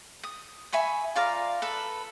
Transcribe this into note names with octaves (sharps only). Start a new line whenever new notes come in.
D#6
E5 G#5 B5 C#6
F4 D5 F5 A#5
A4 B4